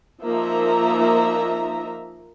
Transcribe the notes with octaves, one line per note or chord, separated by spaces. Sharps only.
F3 A#3 D#4 E5 A#5